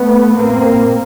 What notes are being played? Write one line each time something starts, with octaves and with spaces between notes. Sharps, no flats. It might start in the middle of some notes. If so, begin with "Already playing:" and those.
Already playing: A3 B3
A#2 A#3 C4